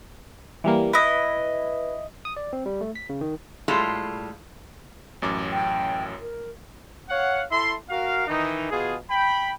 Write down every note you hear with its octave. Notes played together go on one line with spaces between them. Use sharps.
E3 G3 A#3
E4 B4 D#5
D#6
D5
C4
G3
A3
B6
C#3
D#3
A2 G3 G#3 F4 A4
A1 F#2 D6
G5
A#4
C#5 F5 F#5
E4 A4 E5 C6
F#4 A#4 F5
D#3 E3 D#4
B2 F4 G#4
G5 B5